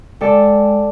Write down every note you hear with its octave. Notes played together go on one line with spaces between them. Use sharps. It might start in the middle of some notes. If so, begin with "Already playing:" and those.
G#3 A4 D5 G5 A5